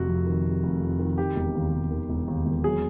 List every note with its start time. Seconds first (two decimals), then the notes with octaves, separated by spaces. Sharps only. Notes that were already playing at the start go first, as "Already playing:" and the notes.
Already playing: F1 C3 F#4
0.08 F2
0.26 D#3
0.45 C3
0.63 F1
0.81 F2
0.99 D#3
1.18 D#3 G4
1.36 E1
1.55 D#2
1.73 E1
1.91 D#3
2.09 E1
2.28 D#2
2.46 E1
2.64 F#3 G#4